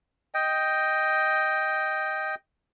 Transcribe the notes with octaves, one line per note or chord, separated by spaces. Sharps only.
D#5 G5